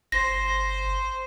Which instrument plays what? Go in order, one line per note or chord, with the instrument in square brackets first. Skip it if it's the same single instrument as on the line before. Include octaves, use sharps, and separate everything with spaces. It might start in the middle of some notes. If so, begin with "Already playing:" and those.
[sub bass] G1 [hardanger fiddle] C5 [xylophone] A#6